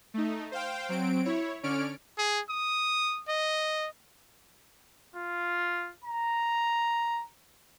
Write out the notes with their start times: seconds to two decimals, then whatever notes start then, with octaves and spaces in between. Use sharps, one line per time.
0.14 A3 D#4
0.52 C5 F5 G5
0.89 F#3 C4 D7
1.25 E4 C#5
1.63 D3 C#4 C#5 D5 F6 D7
2.18 G#4
2.49 D#6
3.28 D#5
5.16 F4
6.04 A#5